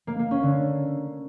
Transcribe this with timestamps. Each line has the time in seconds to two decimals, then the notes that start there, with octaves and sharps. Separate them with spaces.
0.07 A#3
0.19 A#3
0.31 C#4
0.43 D3